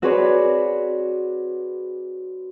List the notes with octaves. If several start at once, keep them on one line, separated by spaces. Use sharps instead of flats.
C4 F#4 G#4 B4 C#5 D5